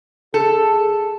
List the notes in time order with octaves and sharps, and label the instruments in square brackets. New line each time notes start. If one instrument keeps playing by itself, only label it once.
[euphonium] G#4 [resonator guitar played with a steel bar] A4